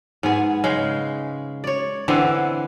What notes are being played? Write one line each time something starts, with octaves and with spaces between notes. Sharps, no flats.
G#2 B3 G#4
C#3 G#3
C#5 D5
D3 E3 B3 C4